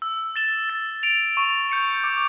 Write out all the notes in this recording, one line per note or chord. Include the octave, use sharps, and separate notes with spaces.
E6
A6 E7 G7
A6
D7 F7
C#6
G6 C#7 F7
D6